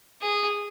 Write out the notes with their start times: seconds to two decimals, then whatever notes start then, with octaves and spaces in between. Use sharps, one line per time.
0.22 G#4